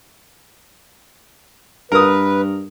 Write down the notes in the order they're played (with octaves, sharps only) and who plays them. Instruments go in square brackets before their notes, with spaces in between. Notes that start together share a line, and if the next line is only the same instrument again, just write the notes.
[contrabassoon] G2 [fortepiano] A#4 D#6 [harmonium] B4